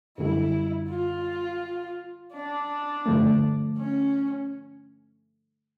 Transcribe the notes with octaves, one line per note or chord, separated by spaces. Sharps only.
F#2 D3 G3 E4
F4
D4
G2 D3 F3 A3
C#4